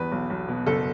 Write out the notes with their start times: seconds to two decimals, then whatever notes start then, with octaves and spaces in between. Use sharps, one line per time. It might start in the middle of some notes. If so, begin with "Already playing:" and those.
Already playing: E2 B4
0.12 B1
0.30 B1
0.48 B2
0.67 F#1 A4